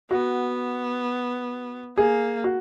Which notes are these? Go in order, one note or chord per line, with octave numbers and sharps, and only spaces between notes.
B3 F#4
A#3 G#4
F#4